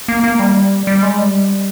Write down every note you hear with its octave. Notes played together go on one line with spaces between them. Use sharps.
A#3
A#3
G3
G3
G#3
G3